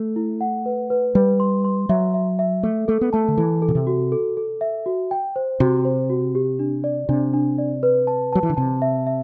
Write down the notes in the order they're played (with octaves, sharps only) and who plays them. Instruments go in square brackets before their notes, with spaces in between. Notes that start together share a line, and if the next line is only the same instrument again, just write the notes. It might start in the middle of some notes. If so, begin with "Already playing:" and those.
Already playing: [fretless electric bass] A3
[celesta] E4
F#5
B4
B4
[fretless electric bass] G3 [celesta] B4
[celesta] C6
C6
[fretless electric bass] F#3 [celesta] E5
[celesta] E5
E5
[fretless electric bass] A3 [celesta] A4
[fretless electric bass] A3 [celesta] A4
[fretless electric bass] B3
[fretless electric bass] A3 [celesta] A5
[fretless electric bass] D3
[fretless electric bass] E3 [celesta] A4
[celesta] A4
[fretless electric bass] B2
C3
[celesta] F#4
A4
A4
E5
F#4
G5
C5
[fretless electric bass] C3 [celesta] F#4
[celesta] C5
F#4
G4
D4
D5
[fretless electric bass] C3 [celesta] D4
[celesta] D4
D5
B4
A5
[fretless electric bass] F#3 [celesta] A5
[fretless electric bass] E3
D3
[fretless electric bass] C3 [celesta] A5
[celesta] E5
E5